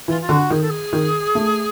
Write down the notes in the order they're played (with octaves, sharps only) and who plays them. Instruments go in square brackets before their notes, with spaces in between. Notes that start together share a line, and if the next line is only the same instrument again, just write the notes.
[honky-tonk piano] E3 [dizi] F4
[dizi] F4
[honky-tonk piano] D3 [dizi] F#4
[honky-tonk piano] D#3 [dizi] G#4
[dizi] A4
G#4
[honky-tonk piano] D#3
A3